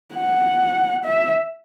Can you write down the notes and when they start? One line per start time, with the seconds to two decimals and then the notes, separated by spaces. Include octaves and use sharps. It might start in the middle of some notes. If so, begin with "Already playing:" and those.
0.15 F#5
1.05 E5